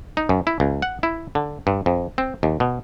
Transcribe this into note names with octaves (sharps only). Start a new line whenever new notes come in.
D#4
F#2
E4
C#2
F#5
E4
D3
G2
F2
C4
D#2
B2